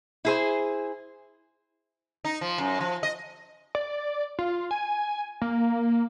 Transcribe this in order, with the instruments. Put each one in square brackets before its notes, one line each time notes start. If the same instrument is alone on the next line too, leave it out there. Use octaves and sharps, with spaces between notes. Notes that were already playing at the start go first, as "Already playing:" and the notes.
[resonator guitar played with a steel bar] E4 G#4 C5
[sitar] D#4
F3
F#2
F3
D#5
[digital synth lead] D5
F4
G#5
A#3